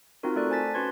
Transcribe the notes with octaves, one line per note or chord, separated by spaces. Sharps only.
C4 D#4 F4 F#4 A#4
A3 A4 D5 F#6
C5 G#5 A5 A6 B6
C#4 F#4 B4 C6 G#6